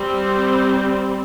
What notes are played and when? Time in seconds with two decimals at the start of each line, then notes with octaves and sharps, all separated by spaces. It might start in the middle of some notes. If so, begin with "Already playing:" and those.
Already playing: G3 C4
0.25 C5